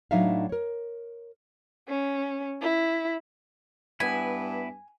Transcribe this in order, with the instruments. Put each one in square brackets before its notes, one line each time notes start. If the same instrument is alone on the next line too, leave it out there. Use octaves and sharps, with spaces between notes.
[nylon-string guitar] A2 F#3 D4 D#4 E5 F5
A#4 C#5
[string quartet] C#4
E4
[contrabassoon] G2 [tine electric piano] B3 B6 [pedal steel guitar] E4 B4 [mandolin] G#5